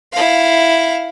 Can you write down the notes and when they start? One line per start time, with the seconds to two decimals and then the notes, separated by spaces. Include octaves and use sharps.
0.12 E4 F5